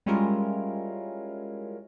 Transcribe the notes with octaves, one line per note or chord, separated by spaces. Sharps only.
G3 G#3 C#4 E4 F4 A#4